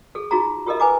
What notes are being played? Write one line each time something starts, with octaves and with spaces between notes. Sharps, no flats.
G#4 A4
D#4 F4 F#4 G#4 A#5
F4 G4 A4 A#4 D#5 E5
B4 G#5 A#5 D6